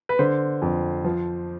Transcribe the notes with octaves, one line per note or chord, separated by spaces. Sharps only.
B4
D3 C5
F2
F3